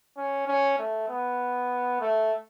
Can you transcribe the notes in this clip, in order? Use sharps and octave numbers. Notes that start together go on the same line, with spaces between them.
C#4
C#4
A3
B3
A3